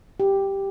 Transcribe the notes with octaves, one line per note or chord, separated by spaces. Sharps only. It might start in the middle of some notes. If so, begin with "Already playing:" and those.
G4